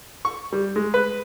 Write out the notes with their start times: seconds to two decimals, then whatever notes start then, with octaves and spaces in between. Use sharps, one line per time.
0.25 C#6
0.52 G3
0.76 G#3
0.94 B4